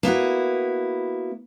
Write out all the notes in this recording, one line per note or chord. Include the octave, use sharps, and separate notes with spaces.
A#3 B3 E4 F#4